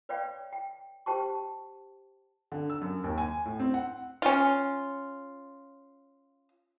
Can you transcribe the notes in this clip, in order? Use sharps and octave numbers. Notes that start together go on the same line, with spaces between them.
B4 C#5 D5 F5 G5
G5
G4 C5 G5 A5 C#6
D3
E6
F#2
D#2
G#5
A2
C4
F#5
C#4 F4